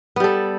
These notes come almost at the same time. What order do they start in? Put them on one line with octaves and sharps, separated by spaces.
B3 G3 A4